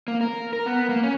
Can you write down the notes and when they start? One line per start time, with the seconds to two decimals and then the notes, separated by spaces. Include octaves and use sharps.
0.08 A#3
0.21 A#4
0.53 A#4
0.66 B3
0.89 A#3
1.03 C#4